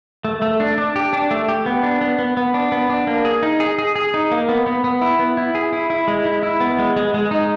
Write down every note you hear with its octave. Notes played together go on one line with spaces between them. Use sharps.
A3
A3
D4
D4
G4
D4
A3
G4
B3
D4
B3
B3
B3
D4
B3
D4
A#3
G#4
D#4
G#4
G#4
G#4
D#4
A#3
B3
B3
B3
E4
B3
E4
G#4
E4
E4
G#3
E4
E4
B3
G#3
G#3
G#3
D#4